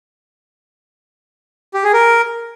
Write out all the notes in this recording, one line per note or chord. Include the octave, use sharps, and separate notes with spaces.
G4
G#4
A#4